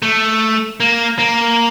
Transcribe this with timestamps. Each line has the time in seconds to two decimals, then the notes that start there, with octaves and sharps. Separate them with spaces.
0.02 A3
0.80 A#3
1.19 A#3